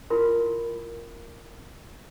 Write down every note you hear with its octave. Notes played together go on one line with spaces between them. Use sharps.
E4 F4 A#4 C6